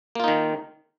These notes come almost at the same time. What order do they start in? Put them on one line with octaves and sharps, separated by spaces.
A#3 F4 D#4 D#3